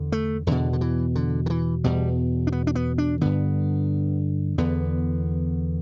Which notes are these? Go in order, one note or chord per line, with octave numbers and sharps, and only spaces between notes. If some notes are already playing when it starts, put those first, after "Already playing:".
Already playing: E2 D3
A3
E2 B2 D3
D3
E3
D3
D3
E3
E2 B2 G3
D4
B3
D4
B3
D4
G2 D3 B3
E2 D3 B3